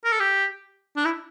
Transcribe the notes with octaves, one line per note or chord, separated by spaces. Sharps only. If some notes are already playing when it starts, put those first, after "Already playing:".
A#4
A4
G4
D4
E4